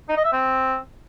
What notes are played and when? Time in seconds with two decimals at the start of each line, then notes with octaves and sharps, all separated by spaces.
0.09 D#4
0.17 D#5
0.25 E5
0.32 C4